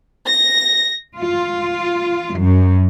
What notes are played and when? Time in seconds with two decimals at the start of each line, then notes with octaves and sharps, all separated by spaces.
0.28 A#6
1.17 F4
2.37 F#2